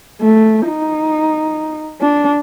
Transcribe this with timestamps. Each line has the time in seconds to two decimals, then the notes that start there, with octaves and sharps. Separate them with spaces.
0.21 A3
0.68 D#4
2.01 D4